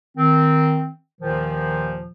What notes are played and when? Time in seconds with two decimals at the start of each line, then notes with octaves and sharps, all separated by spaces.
0.18 D#3 C4
1.21 D#2 A#2 D#3 F3